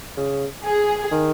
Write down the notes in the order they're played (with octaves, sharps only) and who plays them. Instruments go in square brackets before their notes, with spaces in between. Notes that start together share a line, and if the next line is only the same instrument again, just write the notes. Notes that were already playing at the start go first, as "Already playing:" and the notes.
[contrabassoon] C#3
[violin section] G#4
[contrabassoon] D#3